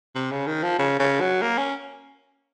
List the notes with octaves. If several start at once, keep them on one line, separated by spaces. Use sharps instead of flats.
C3
C#3
D#3
F3
C#3
C#3
F#3
A#3
C#4